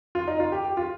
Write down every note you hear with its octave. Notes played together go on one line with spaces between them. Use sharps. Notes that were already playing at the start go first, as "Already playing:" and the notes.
F4
D#4
F4
G4
G4
F4